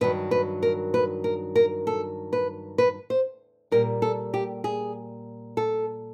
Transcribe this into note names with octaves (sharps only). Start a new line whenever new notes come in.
G2 D#3 F#3 B4
B4
A#4
B4
A#4
A#4
A4
B4
B4
C5
A#2 G3 A#4
A4
G4
G#4
A4